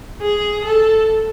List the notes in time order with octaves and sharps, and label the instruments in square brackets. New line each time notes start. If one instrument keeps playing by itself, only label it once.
[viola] G#4
A4